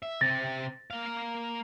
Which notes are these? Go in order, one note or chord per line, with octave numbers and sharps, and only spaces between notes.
E5
C3 C4 A6 A#6
A#3 F5